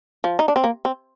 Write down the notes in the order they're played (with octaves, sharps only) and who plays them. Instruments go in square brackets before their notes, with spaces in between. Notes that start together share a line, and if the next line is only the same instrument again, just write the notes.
[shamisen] F3
D#4
D4
C4
A#3
C4